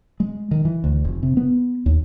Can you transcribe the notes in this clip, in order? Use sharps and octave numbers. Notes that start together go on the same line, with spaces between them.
G#3
D#3
E3
D2
F1
C3
B3
D#2